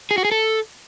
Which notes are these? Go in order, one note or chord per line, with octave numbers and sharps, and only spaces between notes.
G#4
F#4
G#4
A4